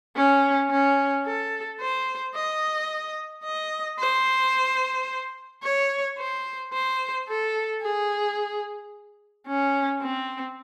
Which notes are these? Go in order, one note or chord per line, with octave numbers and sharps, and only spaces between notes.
C#4
C#4
A4
C5
D#5
D#5
C5
C#5
C5
C5
A4
G#4
C#4
C4